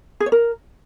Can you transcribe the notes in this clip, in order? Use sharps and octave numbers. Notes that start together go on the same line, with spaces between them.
G#4
C#5
A#4